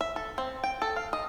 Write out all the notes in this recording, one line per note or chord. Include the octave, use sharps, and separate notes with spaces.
E5
A4
C4
G5
A4
F5
D#5